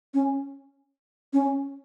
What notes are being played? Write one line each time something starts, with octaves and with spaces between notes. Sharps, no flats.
C#4
C#4